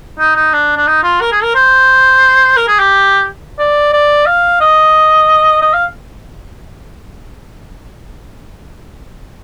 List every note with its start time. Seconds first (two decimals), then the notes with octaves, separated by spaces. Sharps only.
0.19 D#4
0.36 D#4
0.53 D4
0.77 D4
0.87 D#4
1.03 F4
1.21 A#4
1.32 G#4
1.43 A#4
1.55 C5
2.57 A#4
2.67 G#4
2.79 G4
3.59 D5
3.93 D5
4.26 F5
4.61 D#5
5.61 D#5
5.73 F5